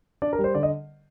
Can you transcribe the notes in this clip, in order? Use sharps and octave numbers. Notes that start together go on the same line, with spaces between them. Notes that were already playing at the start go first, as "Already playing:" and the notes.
D4 D5
A#4
G3
C5
D3 D5
D#5